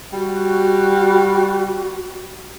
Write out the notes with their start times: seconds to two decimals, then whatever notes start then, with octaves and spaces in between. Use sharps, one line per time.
0.13 G3 F#4